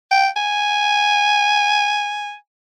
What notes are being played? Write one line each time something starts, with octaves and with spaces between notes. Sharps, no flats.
G5
G#5